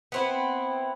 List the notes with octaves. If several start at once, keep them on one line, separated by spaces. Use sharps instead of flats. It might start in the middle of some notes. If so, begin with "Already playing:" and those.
B3 C4 E4